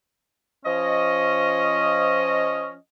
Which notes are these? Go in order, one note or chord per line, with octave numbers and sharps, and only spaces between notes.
F3 C#4 D#5